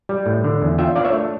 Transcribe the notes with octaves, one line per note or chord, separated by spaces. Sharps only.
G3
A2
D3
E2
F4 E5 G5
D4 D5 F5
C#5 E5
A3